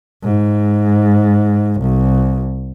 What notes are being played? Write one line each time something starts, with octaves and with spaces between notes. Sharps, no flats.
G#2
C2